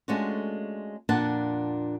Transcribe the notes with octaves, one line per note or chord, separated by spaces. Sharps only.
G#3 A3 C#4 D4 F4 F#4
F2 A#2 D4 F#5 A5